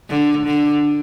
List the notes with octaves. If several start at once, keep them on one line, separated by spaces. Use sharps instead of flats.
D3
D3